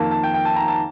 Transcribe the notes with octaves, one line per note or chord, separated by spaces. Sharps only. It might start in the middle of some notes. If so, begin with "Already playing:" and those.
Already playing: F2 D#3 A#3 A5
A5
G5
G5
A5
A#5
A5